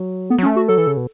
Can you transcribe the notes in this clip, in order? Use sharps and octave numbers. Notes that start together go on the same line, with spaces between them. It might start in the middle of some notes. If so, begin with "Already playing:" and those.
Already playing: F#3
A3 B3
F#3
C#4
A3
F#4
F#3 A4
E3
C#3
B2